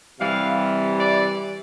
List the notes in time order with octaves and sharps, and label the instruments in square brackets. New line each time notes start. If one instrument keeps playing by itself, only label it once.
[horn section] C3 E3 G3 F5
D5